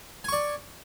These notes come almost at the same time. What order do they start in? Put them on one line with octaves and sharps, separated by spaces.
G#5 C#6 D5